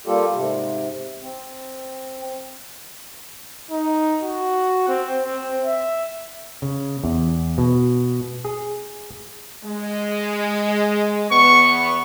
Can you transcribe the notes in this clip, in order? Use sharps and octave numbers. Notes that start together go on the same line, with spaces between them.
G3 A#3 F4 G4 A4
G#2 C3
C4
D#4
F#4
C4
C4
E5
C#3
E2
B2
G#4
G#3
E2 B3 C#6